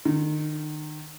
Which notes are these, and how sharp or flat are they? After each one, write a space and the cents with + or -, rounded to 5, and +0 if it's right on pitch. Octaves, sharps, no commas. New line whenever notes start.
D#3 -35